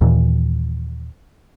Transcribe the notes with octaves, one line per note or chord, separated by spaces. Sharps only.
D#2 A#2 E3